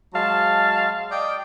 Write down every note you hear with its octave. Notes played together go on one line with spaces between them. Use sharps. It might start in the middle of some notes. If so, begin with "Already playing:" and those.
F#3 G#3 F5 A5
D5 D#5 G5